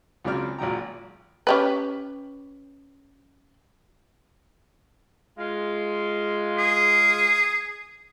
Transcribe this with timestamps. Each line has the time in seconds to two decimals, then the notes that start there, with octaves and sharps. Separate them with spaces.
0.24 C#2 C#3 F#3 C4 D5 F6
0.59 G#1 A#2 F#3 G5 A#5
1.47 C#4 G4 B4
5.38 G#3 F4
6.58 G#4